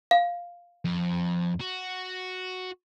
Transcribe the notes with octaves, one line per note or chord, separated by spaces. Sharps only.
F5
F2
F#4